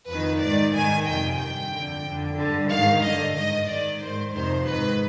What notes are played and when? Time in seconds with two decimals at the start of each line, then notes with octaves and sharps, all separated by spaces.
0.09 F2 D#3 B4
0.42 G#2 D#3 D5
0.75 G#2 D#3 G#5
1.07 F2 C3 D#3 G5
1.40 G2 D#3 G5
1.72 F2 D3
2.05 F2 D3
2.38 G2 D3
2.71 G#2 D#3 F5
3.03 G2 D3 D#5
3.36 G#2 D#3 D#5
3.69 G#2 D#3 D5
4.02 G#2 D#3 C5
4.34 F2 C3 D#3 C5
4.67 G#2 D#3 B4